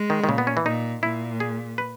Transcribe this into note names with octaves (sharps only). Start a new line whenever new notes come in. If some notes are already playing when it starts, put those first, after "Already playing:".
Already playing: G#3
D#3
D#3
A#2 C#3
B3
C#4
E3
A#2 D#4
A#2 E4
G#4
B4